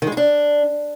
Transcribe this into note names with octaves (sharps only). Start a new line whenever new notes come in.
D#3
G#3
D#4
D4